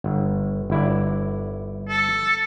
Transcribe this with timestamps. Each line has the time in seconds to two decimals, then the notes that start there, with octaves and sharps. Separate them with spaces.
0.04 G1
0.70 G1 E4 D5
1.89 A4